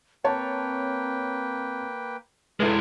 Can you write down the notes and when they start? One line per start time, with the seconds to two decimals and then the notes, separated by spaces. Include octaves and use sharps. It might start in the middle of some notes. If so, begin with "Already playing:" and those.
0.24 A#3 C4 B4 C#5 G5 A5
2.60 G#3 E4 A4 B4